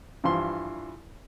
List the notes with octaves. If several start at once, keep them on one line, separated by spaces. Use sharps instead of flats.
G2 E3 F3 C6